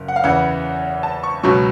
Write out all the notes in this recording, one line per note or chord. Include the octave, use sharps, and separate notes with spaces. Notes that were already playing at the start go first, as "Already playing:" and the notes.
Already playing: F#1
F#5
F5
E2 C#3 E3 F#5
A5
C#6
C#2 B2 F#3 C#6